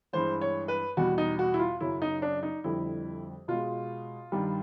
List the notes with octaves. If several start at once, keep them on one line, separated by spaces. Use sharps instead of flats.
G2 E3 G#3 C5
C#5
B4
E2 B2 G3 F#4
D#4
F#4
E4
F4
F#2 C#3 F#3 E4
D#4
D4
D#4
F2 D3 G3 E4
B2 G#3 F4
G2 D#3 G3